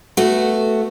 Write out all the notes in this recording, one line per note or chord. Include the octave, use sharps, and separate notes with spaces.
A3 B3 F#4